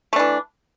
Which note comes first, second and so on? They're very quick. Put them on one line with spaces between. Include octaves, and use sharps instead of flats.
A3 D4 E3